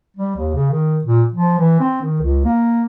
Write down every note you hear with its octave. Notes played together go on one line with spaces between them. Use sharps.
G3
D#2
C#3
D#3
A#2
F3
E3
C4
D#3
C#2
A#3